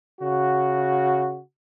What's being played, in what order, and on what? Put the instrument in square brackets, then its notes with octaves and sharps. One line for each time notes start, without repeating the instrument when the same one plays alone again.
[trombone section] C#3 F#4